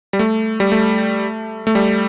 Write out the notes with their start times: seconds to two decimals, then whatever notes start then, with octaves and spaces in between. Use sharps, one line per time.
0.13 G3
0.19 A3
0.60 G3
0.72 A3
1.67 A3
1.75 G3